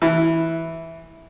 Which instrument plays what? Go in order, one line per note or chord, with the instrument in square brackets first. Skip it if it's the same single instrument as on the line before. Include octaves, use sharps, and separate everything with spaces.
[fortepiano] E3